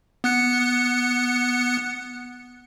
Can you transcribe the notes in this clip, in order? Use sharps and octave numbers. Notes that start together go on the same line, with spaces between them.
B3 F#6 C#7